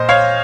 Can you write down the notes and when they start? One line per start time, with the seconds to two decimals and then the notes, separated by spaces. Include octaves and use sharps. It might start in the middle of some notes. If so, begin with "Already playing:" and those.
Already playing: A#2 C5 D#5
0.09 C#5 F5